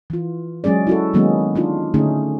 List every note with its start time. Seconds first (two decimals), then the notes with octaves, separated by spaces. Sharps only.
0.10 E3 F4
0.64 F#3 G#3 C#4 G#4 D5
0.87 E4 F#4 A4
1.14 D#3 F#3 G#3 A#3 B3 C#4
1.55 D4 D#4 F4
1.94 D3 A3 C#4 D#4 G#4